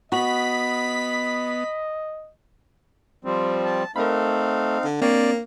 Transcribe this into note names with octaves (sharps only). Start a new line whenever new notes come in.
B3 F#4 D#5 B5 B6
F3 G3 C4
A5
A3 C4 D#4 A#4 F5 B5
D3
A#3 C4 D4 C#5 D5